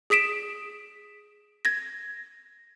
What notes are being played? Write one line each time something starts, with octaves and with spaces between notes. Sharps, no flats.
G#4 D#6 B6 D7 E7
G#6 A#6